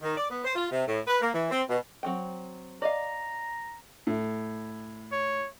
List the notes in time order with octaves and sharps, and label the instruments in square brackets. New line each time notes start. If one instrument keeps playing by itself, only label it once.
[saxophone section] D#3
D5
B3
C5
F4
C3
A2
B4
A#3
E3
C4
B2
[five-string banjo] F#3 C4 G5
[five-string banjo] D5 D#5 F5 [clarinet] A#5
[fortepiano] A2
[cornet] C#5